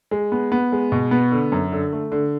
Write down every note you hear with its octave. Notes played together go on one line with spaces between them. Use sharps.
G#3
B3
B3
G#3
B2
B3
D3
F#2
D3
A3
D3